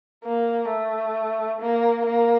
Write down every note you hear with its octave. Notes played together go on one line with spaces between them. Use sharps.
A#3
A3
A#3
A#3